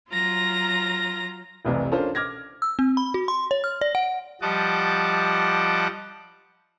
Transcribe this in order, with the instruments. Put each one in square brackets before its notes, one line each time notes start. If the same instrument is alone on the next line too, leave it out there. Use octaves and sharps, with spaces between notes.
[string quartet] F#3 F4 A#5 A#6
[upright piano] F1 C2 C3 E3
C#4 D4 F4 A4 A#4 C5
D6 F6 G#6 A#6
[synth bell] E6
C4
B5
F#4
C6
C#5
F6
D5
F#5
[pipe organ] F3 G3 D#5 F#5 A5 D6